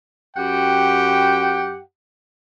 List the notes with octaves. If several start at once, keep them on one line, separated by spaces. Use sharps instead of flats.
F#2 G4 F#5 G5